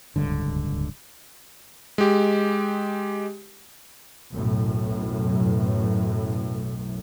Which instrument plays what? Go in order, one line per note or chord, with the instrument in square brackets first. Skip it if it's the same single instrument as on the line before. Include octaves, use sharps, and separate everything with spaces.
[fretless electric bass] D1 C#2 G2 D3
[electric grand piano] G#3 G4
[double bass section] B1 F#2 A2